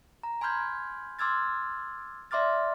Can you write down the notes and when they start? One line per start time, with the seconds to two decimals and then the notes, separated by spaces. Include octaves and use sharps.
0.23 A#5
0.41 G#5 B5 C6 F6 G6 G#6
1.19 C6 D6 E6 F6 G#6 A6
2.31 D5 E5 C6 D6 F6 A6